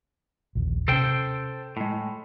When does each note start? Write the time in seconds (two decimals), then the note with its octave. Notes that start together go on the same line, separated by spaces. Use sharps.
0.55 A#1 D#2
0.88 C3 C#4 A4 C5 G5
1.77 A2 G#3